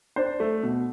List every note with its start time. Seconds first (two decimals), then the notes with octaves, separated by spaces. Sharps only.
0.16 D4 C5
0.40 A3
0.63 B2